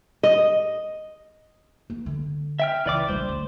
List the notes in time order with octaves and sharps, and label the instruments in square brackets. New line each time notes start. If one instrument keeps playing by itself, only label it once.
[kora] D#5
[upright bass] A#3
D3
[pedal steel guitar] E5 G5 F6
[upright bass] C#2 [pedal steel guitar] E3 D5 D6
[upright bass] A#1 G3 [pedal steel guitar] C5
[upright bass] D2